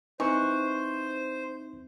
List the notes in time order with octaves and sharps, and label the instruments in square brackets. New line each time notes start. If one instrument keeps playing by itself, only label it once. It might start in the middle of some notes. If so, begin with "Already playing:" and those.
[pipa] E3 [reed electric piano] C4 D#4 [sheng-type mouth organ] C5 [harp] C#6 F#6